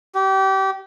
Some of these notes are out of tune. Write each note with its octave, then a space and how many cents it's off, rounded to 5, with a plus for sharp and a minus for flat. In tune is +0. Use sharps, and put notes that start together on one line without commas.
G4 -30